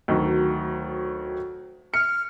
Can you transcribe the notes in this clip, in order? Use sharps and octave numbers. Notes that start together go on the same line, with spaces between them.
D2 D#3 F#3
F6 C#7